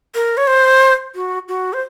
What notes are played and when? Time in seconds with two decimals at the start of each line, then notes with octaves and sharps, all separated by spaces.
0.15 A#4
0.37 C#5
0.47 C5
1.15 F#4
1.48 F#4
1.73 C5